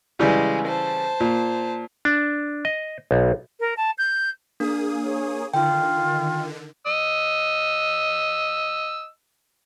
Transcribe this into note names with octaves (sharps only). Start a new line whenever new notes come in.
C#3 E3 G3 G#3
C5 A5
A#2
D4
D#5
B1
A#4
A5
G6
A#3 D4 G#4 D#6
C#5
D3 D#3 F4 G5
D#5 E6